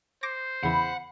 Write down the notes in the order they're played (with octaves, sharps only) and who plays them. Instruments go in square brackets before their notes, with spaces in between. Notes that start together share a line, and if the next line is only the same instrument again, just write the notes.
[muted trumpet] C5 [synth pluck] D6 A#6
[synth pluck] E2 C#3 E3 [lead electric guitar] F#5 [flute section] B5